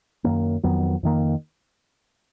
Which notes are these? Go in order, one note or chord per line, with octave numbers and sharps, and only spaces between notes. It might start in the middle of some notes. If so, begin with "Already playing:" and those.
F#2 D#3 A#3
F2 D#3 F#3 B3
F2 D#3 A#3